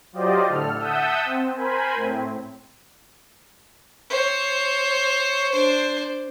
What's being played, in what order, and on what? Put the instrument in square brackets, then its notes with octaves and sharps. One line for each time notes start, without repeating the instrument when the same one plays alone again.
[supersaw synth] F#3 F4 G4 C5 D5 D#5
A2 D3 A4 F6
E5 F#5 A5 D#6 E6 G6
C4
A#4 C5 G#5 B5
A2 C4
[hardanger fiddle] C5 C#5
D4 C5